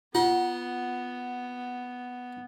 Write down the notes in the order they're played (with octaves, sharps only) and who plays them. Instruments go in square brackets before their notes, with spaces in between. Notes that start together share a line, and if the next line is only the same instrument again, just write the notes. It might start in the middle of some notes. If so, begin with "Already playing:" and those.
[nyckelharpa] B3 [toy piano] F4 [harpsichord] F#5 C6